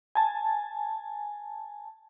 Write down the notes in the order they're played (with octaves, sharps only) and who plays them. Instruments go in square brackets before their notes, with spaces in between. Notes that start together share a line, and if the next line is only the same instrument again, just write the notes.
[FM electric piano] G#5 A5